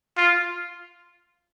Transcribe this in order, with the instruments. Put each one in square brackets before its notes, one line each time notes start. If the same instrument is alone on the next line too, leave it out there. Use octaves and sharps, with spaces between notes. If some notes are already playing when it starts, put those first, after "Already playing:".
[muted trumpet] F4